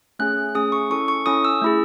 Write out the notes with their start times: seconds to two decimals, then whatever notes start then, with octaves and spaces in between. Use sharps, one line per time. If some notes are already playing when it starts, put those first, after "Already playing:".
0.19 A3 C#4 G#4 F#6
0.55 A3 C#4 G#4 D#6
0.72 C#6
0.90 C#4 E4 A4 C#6
1.08 C#6
1.26 C#4 E4 A4 D#6
1.45 E6
1.62 A3 E4 G#4